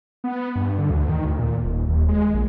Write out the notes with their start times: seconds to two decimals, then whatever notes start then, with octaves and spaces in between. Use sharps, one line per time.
0.24 B3
0.55 G2
0.78 D3
0.91 D2
1.09 D#3
1.25 D2
1.39 A#2
1.65 D#1
1.89 D#2
2.08 G#3
2.34 A#1